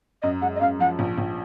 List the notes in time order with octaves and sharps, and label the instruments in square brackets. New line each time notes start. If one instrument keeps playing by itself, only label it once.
[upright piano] F#2 [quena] D#5
[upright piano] G#3 [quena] F#5
[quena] D#5
[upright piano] F#2 [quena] F5
[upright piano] F3 [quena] F#5
[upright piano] A#1
A#1